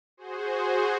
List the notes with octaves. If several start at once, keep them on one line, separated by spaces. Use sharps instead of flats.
F#4 G#4 C5